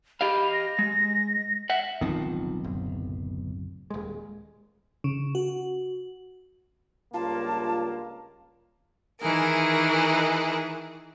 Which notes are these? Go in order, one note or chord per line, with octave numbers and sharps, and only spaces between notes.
G4 D#5 F5 B5
A#6
G#3
E5 F#5
D1 B1 D#3 F3 C4
F#1
D#1 G#3
C#3
F#4
C#2 G2 A#3 F4 A5
D#3 E3 G#4 A#4